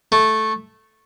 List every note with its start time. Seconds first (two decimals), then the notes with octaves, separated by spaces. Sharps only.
0.12 A3